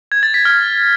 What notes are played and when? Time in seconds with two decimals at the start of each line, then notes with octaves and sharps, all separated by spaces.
0.12 G#6
0.23 A6
0.34 B6
0.45 F6